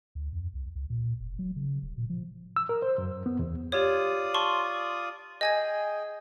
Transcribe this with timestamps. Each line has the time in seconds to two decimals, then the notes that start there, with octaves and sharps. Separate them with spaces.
0.15 D2
0.33 F2
0.53 C2
0.75 C#2
0.90 A#2
1.20 F1
1.39 F#3
1.56 C#3
1.82 D#1
1.97 A#2
2.10 F3
2.56 E6
2.69 A#4
2.82 C5
2.98 F#2
3.26 B3
3.39 E2
3.72 F4 G4 C#5 D5 D#6
4.34 A5 C6 C#6
5.41 G#4 D#5 G5 G#5 G#6